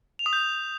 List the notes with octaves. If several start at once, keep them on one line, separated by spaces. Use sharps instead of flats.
F7
D#6
G6